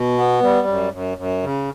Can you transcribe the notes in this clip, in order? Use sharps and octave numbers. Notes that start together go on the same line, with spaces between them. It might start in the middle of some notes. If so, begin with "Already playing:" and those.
Already playing: B2
B3
G3
F#2
F#2
F#2
C#3